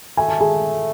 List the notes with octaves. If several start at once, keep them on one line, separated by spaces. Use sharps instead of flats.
A3 G#5
A5
G#4 G#5